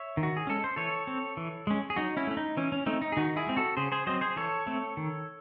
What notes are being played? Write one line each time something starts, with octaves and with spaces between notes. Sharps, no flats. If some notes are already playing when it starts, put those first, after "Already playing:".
Already playing: C#5 E5
D#3
F#4
G#4
G#3 C#4 A4
C5
E3 A4 C#5
C4
E3
G#3 C#4
G#4
F#3 D#4 F#4
C#4 E4
A3 C#4
D#4
E3 C#4
C#4
A3 C4 D#4
D#4
G#4
D#3 D#4 F#4
E4 G#4
G#3 C4
F#4 A4
C#3 G#4 C5
G#4 C5
F#3 C4 C5 D#5
G#4 C5
E3 A4 C#5
A3 C4
D#3